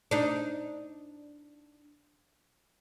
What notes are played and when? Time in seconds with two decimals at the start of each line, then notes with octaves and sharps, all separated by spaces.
0.11 D4 D#4